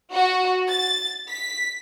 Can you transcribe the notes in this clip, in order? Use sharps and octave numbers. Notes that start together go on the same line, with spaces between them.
F#4
A6
B6